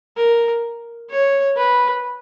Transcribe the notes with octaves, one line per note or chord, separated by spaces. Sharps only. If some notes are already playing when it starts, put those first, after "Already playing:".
A#4
C#5
B4